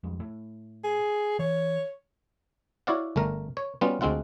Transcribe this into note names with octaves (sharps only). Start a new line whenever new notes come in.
F2 G#2
A2
G#4
E3 C#5
E4 F#4 C#5 D5 F5 F#5
G1 A3 A#4
C#5
G3 B3 C#4 F4 F#4
D2 G#3 C4 F4 F#5